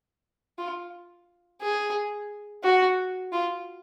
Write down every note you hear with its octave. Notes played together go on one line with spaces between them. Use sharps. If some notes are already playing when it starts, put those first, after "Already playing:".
F4
G#4
F#4
F4